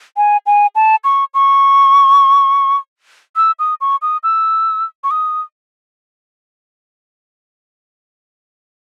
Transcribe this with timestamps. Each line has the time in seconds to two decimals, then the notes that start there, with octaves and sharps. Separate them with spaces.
0.17 G#5
0.46 G#5
0.75 A5
1.04 C#6
1.34 C#6
3.36 E6
3.59 D#6
3.81 C#6
4.02 D#6
4.23 E6
5.04 C#6
5.11 D#6